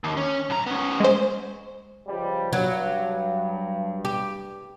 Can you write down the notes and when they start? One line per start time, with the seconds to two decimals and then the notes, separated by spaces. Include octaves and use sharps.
0.04 D#2
0.17 C#4
0.50 B1 A#5
0.66 B3 C#4
1.00 G#3 C5
2.07 C#2 F3 G3
2.53 G2 F#3
4.05 G4